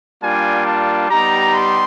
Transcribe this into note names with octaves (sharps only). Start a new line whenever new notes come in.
G3 A#3 D4 F4 G#5
A5
G3 B3 D#4 G4 A#5
C6